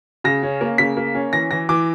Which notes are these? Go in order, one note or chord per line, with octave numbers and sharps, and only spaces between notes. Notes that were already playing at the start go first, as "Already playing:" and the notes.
C#3 A#6
C#4
A#3
C#3 B6
A#3
C#4
E3 A#6
E3 A#6
E3 D6